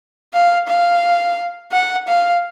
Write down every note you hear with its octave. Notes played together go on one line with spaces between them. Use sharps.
F5
F5
F#5
F5